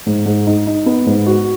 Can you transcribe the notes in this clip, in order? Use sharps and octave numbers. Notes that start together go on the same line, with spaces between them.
G#2
G#2
D#4
D#4
B3
G#2
F#4